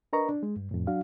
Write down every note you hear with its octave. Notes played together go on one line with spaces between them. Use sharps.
D4 A#4 B4 D#5 A#5 C#6
D4
G#3
G2
F2 A2
F#3 D4 F#4 F5